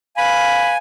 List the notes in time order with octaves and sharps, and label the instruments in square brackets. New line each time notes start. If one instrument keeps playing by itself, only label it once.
[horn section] B4 B5 [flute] F5 [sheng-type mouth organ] G#5